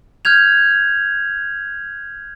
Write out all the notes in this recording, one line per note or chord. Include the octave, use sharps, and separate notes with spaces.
F6 G6 G#6 F7